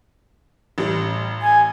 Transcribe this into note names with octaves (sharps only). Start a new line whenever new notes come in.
A1 G3
G#5